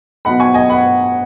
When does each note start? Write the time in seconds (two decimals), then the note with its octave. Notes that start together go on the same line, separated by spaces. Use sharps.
0.25 B2 F#3 B3 D#4 F#5 B5
0.40 G#5 C#6
0.54 D#5 G#5
0.70 F#5 B5